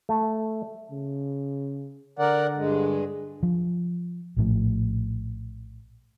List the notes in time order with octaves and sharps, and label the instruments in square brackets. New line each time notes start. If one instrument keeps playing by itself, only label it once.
[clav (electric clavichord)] A3
[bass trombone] C#3
[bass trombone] D3 [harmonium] A#4 D5 F#5
[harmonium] G2 G#3
[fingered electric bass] F3
A#1 A2 F3